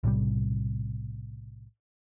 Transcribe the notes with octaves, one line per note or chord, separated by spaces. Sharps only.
B1 A2 C3 G3